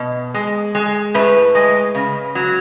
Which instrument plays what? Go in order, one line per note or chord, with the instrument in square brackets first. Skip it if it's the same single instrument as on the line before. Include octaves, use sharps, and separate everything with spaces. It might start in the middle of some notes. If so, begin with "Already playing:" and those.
Already playing: [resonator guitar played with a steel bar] B2
G#3
G#3
A2 B4
G#3
C#3
F#3